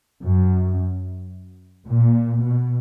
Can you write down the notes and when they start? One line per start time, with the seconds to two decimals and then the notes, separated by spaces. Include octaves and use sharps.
0.23 F#2
1.88 A#2
2.43 B2